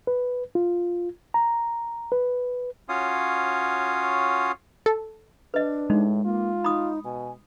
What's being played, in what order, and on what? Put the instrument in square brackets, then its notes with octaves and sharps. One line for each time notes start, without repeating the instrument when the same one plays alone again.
[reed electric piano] B4
F4
A#5
B4
[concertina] C#4 F4 F#4 C#5 F5 D#6
[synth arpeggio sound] A4
[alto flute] D4 [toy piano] B4 D#5
[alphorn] A2 [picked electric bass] G#3 [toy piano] D#4
[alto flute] A#3 [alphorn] F4
[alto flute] D#4 [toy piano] B5 D#6
[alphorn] B2 [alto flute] G#5